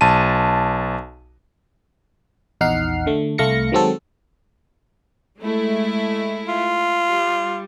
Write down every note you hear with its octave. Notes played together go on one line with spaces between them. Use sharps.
B1 A5 D#7
A#1 E2 D#4 F#5 F6 C7
D3 A3
C2 A3 F5 A#6 C#7
D#3 F#3 G#3 C4 F#4 A4
G#3 A3 E4
F4
G3